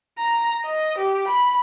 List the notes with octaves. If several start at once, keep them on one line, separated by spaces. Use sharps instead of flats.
A#5
D#5
G4
B5